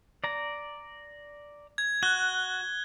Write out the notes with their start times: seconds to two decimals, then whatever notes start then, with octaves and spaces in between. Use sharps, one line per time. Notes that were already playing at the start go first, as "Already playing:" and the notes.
0.24 D5 A#5
1.78 G#6
2.03 F#4 F#6 G7